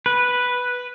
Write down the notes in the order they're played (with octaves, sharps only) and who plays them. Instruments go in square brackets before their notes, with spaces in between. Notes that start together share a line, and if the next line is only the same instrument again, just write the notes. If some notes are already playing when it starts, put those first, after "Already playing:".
[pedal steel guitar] B4